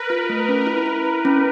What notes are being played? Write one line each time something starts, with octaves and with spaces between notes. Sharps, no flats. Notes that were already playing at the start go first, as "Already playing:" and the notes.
Already playing: A#4 B4
F4
A3
C#4
E4
E4
E4
C#4